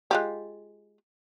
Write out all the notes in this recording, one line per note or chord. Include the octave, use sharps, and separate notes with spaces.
G#3 F4 G4